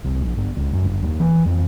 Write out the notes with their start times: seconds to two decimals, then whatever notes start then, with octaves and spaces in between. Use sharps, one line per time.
0.04 C2
0.22 A#1
0.37 G1
0.57 C#2
0.73 F#2
0.86 G1
1.02 D#2
1.20 E3
1.46 F2